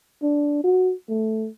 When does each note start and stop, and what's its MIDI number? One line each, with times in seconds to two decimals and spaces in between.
0.23 0.62 62
0.64 0.93 66
1.09 1.48 57